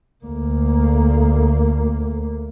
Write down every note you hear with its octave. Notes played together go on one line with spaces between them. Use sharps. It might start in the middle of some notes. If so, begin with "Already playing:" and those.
D2 A#3